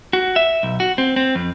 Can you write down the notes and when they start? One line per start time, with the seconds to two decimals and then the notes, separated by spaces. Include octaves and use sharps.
0.13 F#4
0.36 E5
0.63 B1
0.80 F#4
0.98 C4
1.16 C4
1.35 F2